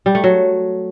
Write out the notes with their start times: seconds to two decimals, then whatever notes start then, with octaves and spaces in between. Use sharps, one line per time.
0.06 G3
0.15 A3
0.24 F#3